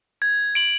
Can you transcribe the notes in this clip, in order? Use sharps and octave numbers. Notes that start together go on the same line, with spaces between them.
G#6
D7 F#7